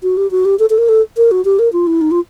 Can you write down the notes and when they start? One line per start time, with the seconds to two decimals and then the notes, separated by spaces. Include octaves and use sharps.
0.03 F#4
0.17 G4
0.31 F#4
0.45 G4
0.59 A4
0.70 A4
0.78 A#4
0.89 A4
1.17 A#4
1.31 F#4
1.45 G4
1.59 A#4
1.73 F4
1.87 E4
2.01 D#4
2.11 F4